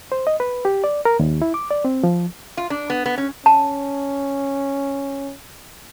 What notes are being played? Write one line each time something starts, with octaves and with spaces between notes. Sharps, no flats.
C5
D#5
B4
G4
D5
A#4
D#2
E4
D6
D5
C4
F3
F4
D4
B3
B3
C#4
C#4 A5